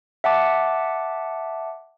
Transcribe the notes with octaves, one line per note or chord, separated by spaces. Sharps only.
E5 F#5 A5 D6